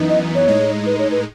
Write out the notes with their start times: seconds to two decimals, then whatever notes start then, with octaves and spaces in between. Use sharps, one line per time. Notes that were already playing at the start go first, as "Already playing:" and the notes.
Already playing: F#2 E3 B3 D#4
0.09 D#5
0.35 C#5
0.48 A2 G#3 D#4
0.86 B4
0.99 C#5
1.11 B4